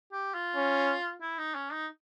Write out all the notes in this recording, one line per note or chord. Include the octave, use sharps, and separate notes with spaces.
G4
F4
C#4
E4
D#4
C#4
D#4